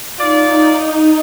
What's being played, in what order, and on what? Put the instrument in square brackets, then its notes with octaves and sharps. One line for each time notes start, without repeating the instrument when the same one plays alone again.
[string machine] D#4 [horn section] F4 D5